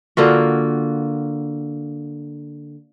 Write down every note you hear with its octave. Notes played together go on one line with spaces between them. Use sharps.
D3 A#3 F4 F#4